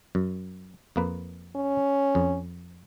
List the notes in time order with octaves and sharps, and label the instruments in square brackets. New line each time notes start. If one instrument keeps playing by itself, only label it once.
[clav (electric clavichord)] F#2
F2 A#3 B4
[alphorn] C#4
[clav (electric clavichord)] F2